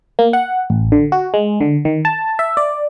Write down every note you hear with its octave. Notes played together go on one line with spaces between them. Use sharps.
A#3
F#5
A1
D3
F#4
G#3
D3
D#3
A5
E5
D5